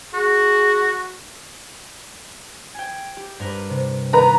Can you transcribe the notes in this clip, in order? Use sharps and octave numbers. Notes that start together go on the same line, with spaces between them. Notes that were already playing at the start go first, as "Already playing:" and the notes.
F#4 G#4
G5 G#5
G4
G2 A#4 B4
C3
D#3 B3 B4 A#5